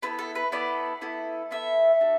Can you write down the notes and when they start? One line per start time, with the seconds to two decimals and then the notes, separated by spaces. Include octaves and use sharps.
0.02 B3 E4 A4 B4
0.19 A4
0.35 B4
0.52 B3 E4 A4 D5
1.01 B3 E4 A4
1.51 B3 E4 A4 E5
2.01 D4 F#4 A4